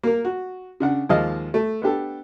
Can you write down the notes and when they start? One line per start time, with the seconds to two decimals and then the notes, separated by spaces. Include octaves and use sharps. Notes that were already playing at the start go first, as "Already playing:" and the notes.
0.03 A#3 A#4
0.25 F#4
0.80 C#3 D4 F#5
1.09 D#2 F3 G#3 D#5 F5
1.54 A3
1.82 B3 D4 G4 A4